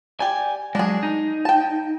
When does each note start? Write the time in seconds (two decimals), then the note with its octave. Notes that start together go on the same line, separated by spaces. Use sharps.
0.20 G4 D5 G#5
0.75 F#3 G#3 D4 G#4
1.03 D#4
1.45 G5 A5